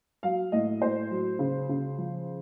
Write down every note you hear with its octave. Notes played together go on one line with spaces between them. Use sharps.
F#3 F5
A2 D#5
A2 C5
F#3
C#3
C#3
F3